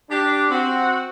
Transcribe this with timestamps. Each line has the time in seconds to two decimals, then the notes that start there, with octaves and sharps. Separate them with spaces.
0.10 D4 G4
0.50 C4 F#4